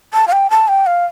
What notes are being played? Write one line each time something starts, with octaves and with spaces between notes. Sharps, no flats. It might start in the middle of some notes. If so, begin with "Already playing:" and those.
A5
F5
G5
A5
G5
F5